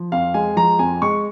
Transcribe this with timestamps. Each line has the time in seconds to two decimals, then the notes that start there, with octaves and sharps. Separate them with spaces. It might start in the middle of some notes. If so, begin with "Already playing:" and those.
Already playing: F3
0.12 F2 F5
0.34 G#3 G#5
0.56 F3 A#5
0.79 F2 G#5
1.02 G#3 C#6